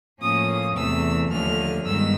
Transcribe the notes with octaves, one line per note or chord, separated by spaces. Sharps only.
A2 F3 A#3 C#4 D#6
E2 C3 E3 A3 E6
D#2 D3 F3 A3 C#4 F6
G2 D#3 G#3 B3 E6